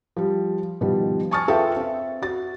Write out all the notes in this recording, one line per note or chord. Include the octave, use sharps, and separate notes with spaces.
F3 G3
B2 D#3 F3 G3
G#5 A5 C#6 D#6 F6 A6
F4 A4 B4 E5 F5 G5
C4 E5
F#4 A6